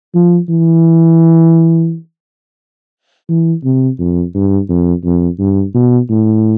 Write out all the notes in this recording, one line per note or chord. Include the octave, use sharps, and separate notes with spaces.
F3
E3
E3
C3
F2
G2
F2
F2
G2
B2
A2